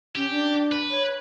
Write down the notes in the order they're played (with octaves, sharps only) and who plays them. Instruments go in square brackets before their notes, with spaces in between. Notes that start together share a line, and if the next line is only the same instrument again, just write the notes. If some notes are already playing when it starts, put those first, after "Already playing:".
[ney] C#4 [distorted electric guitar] G4
[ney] D4
[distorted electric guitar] B4
[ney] C#5